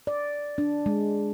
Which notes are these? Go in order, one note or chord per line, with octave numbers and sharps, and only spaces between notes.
D5
D4
G#3